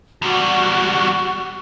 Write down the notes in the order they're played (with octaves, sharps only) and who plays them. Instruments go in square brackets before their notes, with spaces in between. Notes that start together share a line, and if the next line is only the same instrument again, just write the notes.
[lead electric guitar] E2 G3 [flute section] F#4